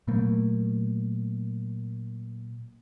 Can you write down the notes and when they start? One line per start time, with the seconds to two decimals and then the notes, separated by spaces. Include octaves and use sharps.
0.08 A#2 F#3 A3 A#3